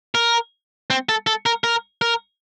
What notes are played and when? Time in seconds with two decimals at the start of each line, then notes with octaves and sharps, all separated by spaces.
0.15 A#4
0.90 C4
1.09 A4
1.27 A4
1.46 A#4
1.64 A#4
2.02 A#4